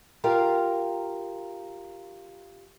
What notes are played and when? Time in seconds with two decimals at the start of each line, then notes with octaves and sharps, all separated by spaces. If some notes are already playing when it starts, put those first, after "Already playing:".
0.24 F4 G4 A#4 F5